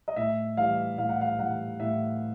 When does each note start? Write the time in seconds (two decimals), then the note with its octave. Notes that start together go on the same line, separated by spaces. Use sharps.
0.08 D#5
0.16 A2 E5
0.57 E3 G3 F5
0.98 A2 F5
1.09 F#5
1.21 F5
1.39 E3 G3 F#5
1.80 A2 E5